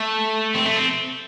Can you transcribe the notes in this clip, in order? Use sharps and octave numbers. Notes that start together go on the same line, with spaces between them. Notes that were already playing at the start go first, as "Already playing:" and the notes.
Already playing: A3
C4
A3
C4